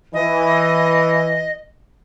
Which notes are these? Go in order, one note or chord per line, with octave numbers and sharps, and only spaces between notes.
E3 D#5